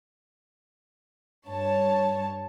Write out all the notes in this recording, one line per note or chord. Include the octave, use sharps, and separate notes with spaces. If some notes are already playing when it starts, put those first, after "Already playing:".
G2 C#5 A5